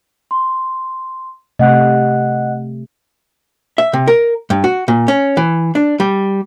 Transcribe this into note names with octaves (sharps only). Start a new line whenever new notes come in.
C6
C3 A3 D#5 F#5 F#6
E5
C3
A#4
G2
F#4
A#2
C#4
E3
D4
G3